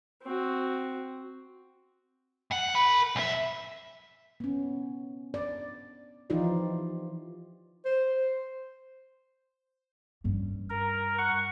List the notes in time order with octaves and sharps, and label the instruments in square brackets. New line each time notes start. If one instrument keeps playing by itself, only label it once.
[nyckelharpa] C4 F#4
[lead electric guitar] F#2 F#5
A#4 B5
B1 E5
[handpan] B3 C#4
D5
E3 F3 D#4 F4 G4 D5
[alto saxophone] C5
[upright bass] G2 C#4
[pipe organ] A#4
F#5 C#6